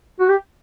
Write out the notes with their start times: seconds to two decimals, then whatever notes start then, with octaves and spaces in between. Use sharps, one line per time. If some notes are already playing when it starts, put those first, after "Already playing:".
0.20 F#4
0.29 G4